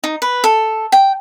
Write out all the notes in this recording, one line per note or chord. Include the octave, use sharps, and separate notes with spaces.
D#4
B4
A4
G5